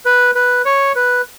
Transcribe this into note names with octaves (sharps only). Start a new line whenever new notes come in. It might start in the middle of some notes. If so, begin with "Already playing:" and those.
B4
B4
C#5
B4